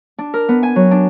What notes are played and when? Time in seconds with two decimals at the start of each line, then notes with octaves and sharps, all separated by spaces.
0.18 D4
0.34 A#4
0.49 B3
0.63 G#5
0.76 F#3
0.91 D4